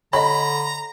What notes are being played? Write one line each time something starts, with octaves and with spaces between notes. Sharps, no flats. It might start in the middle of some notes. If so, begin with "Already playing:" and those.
D3 C#5 D#5 A#5 B5